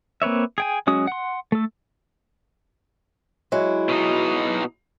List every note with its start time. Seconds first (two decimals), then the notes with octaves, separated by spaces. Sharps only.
0.22 A#3 C4 B4 C#5 E5
0.58 G#4 G5 G#5
0.87 F#3 G#3 C#4 F#4 D#6
1.07 F#5 C6
1.52 A3 A4
3.52 F#3 G#3 E4
3.89 B2 D#4